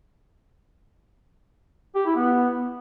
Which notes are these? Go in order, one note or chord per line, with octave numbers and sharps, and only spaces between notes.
G4
E4
B3